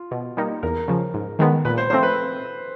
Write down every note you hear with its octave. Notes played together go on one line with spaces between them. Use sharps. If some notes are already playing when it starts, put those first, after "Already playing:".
Already playing: F4
B2
G3 A#3 D#4
E2 A#4
C#3 F3
G#2
D#3 G#3 B3
A#2 B4
C5
F3 A3 C4 C5
B4